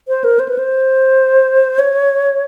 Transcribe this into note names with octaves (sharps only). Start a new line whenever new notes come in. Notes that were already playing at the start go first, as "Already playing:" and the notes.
C5
A#4
C5
B4
C5
C#5